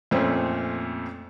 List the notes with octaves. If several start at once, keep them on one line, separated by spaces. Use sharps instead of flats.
F2 A#2 A3 C4 C#4